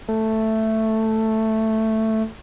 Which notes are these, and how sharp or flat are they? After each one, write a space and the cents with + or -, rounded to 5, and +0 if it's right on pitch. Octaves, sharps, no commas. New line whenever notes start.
A3 +5